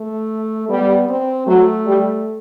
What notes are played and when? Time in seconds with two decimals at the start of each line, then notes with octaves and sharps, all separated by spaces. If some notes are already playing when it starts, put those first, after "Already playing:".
Already playing: A3
0.69 G3 B3
1.09 C4
1.47 F#3 A3
1.86 G3